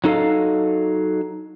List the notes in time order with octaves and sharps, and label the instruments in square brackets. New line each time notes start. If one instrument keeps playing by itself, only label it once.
[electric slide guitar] F#3 D#4 A4 D#5 F5